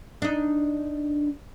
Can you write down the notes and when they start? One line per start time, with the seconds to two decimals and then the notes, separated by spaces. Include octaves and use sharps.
0.22 D4 D#4